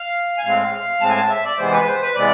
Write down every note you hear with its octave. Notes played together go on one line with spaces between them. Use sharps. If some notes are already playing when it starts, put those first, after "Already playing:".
Already playing: F5
G#5
A2 G#3 C4 F5
A2 G#3 C4 A5
G#5
A5
E5
D5
C3 E3 G#3 B3 C5
B4
C5
B4
C3 E3 G#3 B3 D5